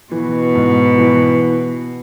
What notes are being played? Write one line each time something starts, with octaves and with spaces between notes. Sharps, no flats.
B2 E3
G#2
E3